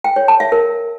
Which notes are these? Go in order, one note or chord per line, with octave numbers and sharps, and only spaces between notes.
G5
C#5
A5
E5
A#4